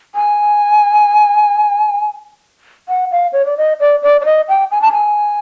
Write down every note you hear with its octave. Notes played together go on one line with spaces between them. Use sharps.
G#5
F#5
F5
C#5
D5
D#5
D5
D5
D5
D#5
G5
G#5
A5
G#5